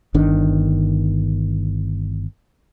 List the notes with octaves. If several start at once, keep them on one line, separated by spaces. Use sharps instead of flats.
G1 D#3 D4